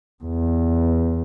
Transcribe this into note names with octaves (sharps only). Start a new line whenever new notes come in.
E2